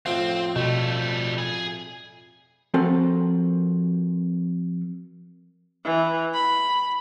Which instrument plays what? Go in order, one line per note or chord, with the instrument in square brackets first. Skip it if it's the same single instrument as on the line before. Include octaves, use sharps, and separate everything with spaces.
[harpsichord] F2 A2 F3 [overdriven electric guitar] C4 [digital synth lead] F5
[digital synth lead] B2 [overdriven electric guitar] G3 A3
[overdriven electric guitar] G#4 G#5
[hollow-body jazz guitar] F3 C4 F#4 A4 A#4
[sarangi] E3
B5